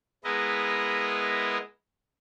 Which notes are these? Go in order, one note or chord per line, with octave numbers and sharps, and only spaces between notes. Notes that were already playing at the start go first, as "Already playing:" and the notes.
G#3 B3 E4 A#4 B4 D#5